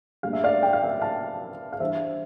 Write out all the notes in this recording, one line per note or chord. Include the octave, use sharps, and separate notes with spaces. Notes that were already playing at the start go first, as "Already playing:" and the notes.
A2 G3 A#3 D4 F5
E5
D5 F5
G5
F5
E5 G5
F5 A5
F5
E3 G3 D4 C5 E5